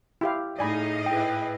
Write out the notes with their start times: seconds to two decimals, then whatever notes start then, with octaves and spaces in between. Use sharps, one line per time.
0.21 E4 G4 F5
0.59 A2 D#4 G#4 D5 D#5 F5 G#5 B5
1.06 E4 G#4 B4 G5